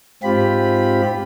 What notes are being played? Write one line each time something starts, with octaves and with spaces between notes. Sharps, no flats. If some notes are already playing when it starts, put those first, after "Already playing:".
G#2 C4 F4 G4 B5